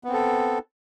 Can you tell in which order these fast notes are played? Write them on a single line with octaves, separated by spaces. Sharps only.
B3 C4 A4